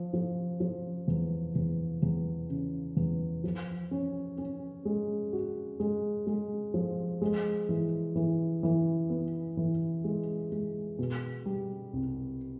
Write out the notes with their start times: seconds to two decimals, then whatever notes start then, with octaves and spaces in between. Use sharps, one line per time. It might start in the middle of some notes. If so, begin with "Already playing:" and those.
Already playing: F3
0.13 F3
0.60 F3
1.08 E2
1.55 E2
2.03 E2
2.50 C#3
2.97 E2
3.44 F3
3.91 C#4
4.38 C#4
4.85 G#3
5.33 F#4
5.80 G#3
6.27 G#3
6.74 F3
7.22 G#3
7.69 E3
8.16 E3
8.63 E3
9.10 B3
9.57 E3
10.04 G#3
10.52 G#3
10.99 B2
11.46 G3
11.93 C2